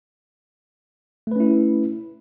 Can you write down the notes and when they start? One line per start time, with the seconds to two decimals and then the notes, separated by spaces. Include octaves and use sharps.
1.27 A3
1.31 B4
1.36 C#4
1.40 E4